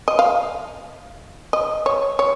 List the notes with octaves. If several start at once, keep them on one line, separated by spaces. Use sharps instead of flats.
D#5
F5
D#5
C#5
C#5